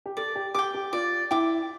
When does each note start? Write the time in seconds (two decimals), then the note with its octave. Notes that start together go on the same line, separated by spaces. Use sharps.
0.06 G4
0.17 A4 D5
0.36 G4
0.54 G4 G5 D6
0.74 G4
0.92 F4 D5
1.31 E4 G5 D6